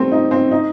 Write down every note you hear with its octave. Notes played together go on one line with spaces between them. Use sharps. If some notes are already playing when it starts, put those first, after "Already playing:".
Already playing: G3 A3 C4
D#4
C4
D#4